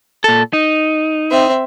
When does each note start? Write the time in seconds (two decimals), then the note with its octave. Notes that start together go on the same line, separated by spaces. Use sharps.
0.24 A#2 A4
0.53 D#4
1.31 C4 E5